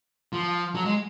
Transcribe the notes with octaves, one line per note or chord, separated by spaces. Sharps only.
F3
F#3
G#3